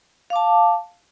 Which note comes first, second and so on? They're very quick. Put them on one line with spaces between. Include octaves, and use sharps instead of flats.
F5 D6 A5